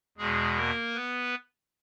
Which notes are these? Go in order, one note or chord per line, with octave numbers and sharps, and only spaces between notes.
E2 B2 G#3 G#4
A#3 A#4
B3 B4